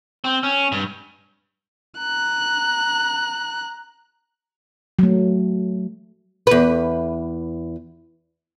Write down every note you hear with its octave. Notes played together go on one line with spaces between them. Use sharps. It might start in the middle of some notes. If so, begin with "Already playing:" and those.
C4
C#4
G2
A#5 F#6
F#3 A3
E2 B4